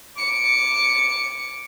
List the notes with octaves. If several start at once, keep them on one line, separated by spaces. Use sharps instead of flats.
D6 C#7